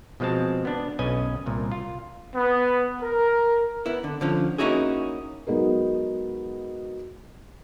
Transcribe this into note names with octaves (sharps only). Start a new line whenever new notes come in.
B2 F3 G#3 C4 A5
B3 D4
B1 C#4 B4 D#5 G#5
C2 A#2
F4
B3
A#4
B3 E4
D3
D3 F3 C#4
A#3 C#4 D#4 E4 F#4 G#4
F#3 G#3 B3 D#4 G#4 A#4